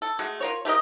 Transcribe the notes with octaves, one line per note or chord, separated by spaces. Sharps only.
A4
G#3 A3 F#4
F4 A#4 C#5
A3 G4 A#4 D#5